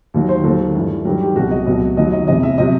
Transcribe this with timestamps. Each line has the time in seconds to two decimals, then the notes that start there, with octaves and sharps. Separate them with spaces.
0.14 D#2 D#3 F#3
0.29 C5
0.44 D#2 D#3 F#3 A4
0.75 G2 E3
1.05 G2 D#3 F#3 G4
1.21 G4
1.36 C2 B2 F#3 F#4
1.51 D#5
1.66 C2 B2 F#3 D#5
1.97 D#2 D#3 F#3 D#5
2.12 D#5
2.28 E2 C3 E3 D#5
2.43 E5
2.58 C3 F#3 D#5